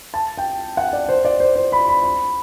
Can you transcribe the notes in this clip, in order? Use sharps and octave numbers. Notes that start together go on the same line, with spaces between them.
A5
G5
F#5
D5
C5
D5
C5
C5
B5
B5
B5